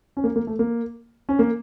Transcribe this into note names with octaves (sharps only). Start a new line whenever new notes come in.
C#4
A#3
A#3
A3
A#3
C#4
A#3